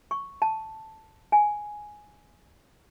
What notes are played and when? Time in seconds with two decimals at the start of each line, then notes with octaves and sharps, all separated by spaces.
0.11 C#6
0.42 A5
1.32 G#5